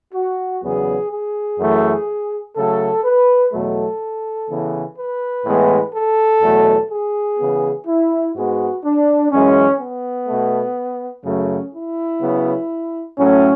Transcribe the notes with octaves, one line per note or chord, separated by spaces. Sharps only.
F#4
E2 C#3 F#3 B3 G#4
G#4
F#2 E3 A3
C#3 F#3 A3 A4
B4
E2 B2 F#3 A3 A4
C#3 E3 B3
B4
A2 E3 G#3 B3
A4
E2 B2 F#3 A3
G#4
C#3 E3 B3
E4
G#2 G#3 B3 F#4
D4
F#2 E3 G#3 C#4
B3
B2 A3
F#2 C#3 F#3 A3 C#4
E4
C#3 F#3 B3
A2 F#3 A3 C#4